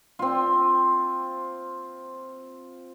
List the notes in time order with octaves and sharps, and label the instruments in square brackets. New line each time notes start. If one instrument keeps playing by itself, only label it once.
[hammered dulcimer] C4 F4